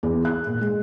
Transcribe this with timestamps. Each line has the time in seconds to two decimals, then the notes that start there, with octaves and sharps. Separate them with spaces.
0.03 E2
0.25 F#6
0.47 A#2
0.61 G#3